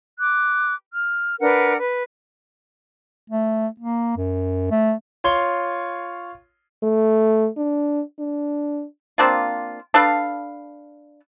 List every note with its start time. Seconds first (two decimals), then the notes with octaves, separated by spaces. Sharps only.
0.20 D6 F#6
0.93 F6
1.40 D4 A#4 B4 F#5
1.78 B4
3.30 A3
3.80 A#3
4.17 F#2
4.71 A3
5.24 F4 C#5 C6 G7
6.83 A3
7.57 D4
8.19 D4
9.18 A#3 C4 D4 F4
9.94 D4 A4 B4 F5